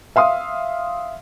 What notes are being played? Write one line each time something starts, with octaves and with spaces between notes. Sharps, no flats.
E5 F5 C6 D#6